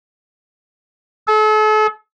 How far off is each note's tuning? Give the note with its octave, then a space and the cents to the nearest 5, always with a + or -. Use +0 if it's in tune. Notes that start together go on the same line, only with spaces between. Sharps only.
A4 -40